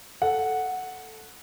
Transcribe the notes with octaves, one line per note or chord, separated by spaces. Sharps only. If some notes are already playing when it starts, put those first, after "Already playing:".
A4 F#5